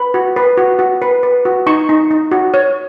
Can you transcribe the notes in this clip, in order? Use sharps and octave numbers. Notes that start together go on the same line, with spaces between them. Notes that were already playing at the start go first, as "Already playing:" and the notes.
Already playing: B4 B5
F#4
B4
F#4
F#4
B4
B4
F#4
D#4 C#6
D#4
D#4
F#4
C#5